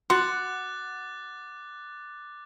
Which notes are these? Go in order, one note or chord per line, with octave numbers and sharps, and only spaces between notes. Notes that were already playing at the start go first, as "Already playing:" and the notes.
F#4 F#5 C6 D6 F#6 A6